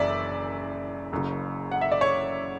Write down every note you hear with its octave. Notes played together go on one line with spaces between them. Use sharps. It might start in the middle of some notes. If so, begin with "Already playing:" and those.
Already playing: F#1 F#2 E3 D5 E5
F#1 F#2 C#3
F#5
E5
D5
C#5